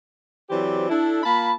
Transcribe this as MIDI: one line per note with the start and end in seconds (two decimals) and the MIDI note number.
0.50 0.88 52
0.50 0.88 54
0.50 0.88 60
0.50 0.88 67
0.50 0.88 72
0.50 0.88 74
0.90 1.22 62
0.90 1.22 64
0.90 1.22 69
1.23 1.53 58
1.23 1.53 65
1.23 1.53 81
1.23 1.53 83